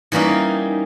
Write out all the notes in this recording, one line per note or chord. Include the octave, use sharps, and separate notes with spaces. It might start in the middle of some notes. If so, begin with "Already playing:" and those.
E3 G3 A#3 C#4 D#4